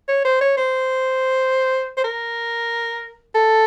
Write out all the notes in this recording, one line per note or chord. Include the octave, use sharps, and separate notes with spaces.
C#5
C5
C#5
C5
C5
A#4
A4